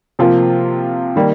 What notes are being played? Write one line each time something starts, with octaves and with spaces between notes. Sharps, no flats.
C3 F3 A#3 F4
D#3 G3 A#3